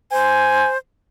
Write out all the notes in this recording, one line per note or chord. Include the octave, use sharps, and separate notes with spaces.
C5 G#5